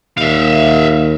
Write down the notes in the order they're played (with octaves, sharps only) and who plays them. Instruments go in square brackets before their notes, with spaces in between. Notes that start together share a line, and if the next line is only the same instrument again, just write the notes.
[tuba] D#2 [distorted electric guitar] E5 F5